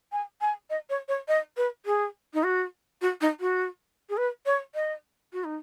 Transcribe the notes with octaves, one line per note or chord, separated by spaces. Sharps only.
G#5
G#5
D#5
C#5
C#5
D#5
B4
G#4
D#4
F#4
F#4
D#4
F#4
G#4
B4
C#5
D#5
F#4
D#4